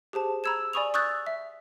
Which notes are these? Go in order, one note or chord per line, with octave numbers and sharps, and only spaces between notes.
G4 G#4 C5 A5
A#5 B5 E6 G#6 E7
D5 G#5 B5 C#6 D#6 F7
C#6 D#6 E6 F#6 G6 A6
E5